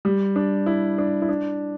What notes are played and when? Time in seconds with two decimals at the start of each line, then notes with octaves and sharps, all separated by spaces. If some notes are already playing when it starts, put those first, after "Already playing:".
0.05 G3
0.36 D4
0.66 E4
0.98 D4
1.22 E4
1.29 D4